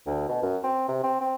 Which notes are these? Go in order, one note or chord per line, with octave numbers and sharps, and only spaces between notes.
D2
B2
F#2
C4
C3
C4
C4